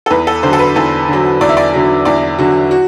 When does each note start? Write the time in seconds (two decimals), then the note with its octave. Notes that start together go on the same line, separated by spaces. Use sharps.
0.06 A4
0.10 E2 B4
0.27 A4
0.43 D3 F#3 C5
0.53 A4
0.59 B4
0.76 E2 A4
1.08 D3 F#3
1.41 E2 D5
1.49 E5
1.57 D5
1.73 D3 F#3
2.05 E2 D5
2.39 D3 F#3 F#4
2.71 F#4